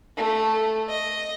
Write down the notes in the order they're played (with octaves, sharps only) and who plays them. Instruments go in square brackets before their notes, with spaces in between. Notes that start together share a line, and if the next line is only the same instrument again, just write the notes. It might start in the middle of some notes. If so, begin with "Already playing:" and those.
[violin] A3
D#5